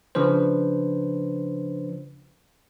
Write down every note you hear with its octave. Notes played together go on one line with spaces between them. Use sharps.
C#3 F3 D4 B4 C5